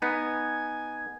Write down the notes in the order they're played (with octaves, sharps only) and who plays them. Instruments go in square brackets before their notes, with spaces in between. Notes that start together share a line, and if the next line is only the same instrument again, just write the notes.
[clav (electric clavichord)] B3 D#4 [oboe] G#5